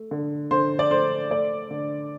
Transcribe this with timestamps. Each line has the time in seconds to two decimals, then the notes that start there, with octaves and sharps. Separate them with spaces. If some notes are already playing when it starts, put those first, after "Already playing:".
Already playing: A3
0.11 D3
0.51 D3 C5
0.79 D5
0.90 A3 C5
1.30 A3 D5
1.71 D3